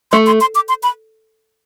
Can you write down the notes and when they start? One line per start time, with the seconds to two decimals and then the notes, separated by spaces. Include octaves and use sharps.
0.12 A3 C6
0.26 C6
0.41 C6
0.55 D6
0.69 C6
0.83 B5